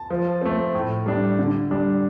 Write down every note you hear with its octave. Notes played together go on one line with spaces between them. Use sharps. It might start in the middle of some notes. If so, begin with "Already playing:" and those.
Already playing: A5
F3
A3 C4
A2
G3 D4
D3
G3 D4